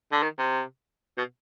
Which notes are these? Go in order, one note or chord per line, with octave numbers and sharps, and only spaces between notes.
D3
D#3
C3
B2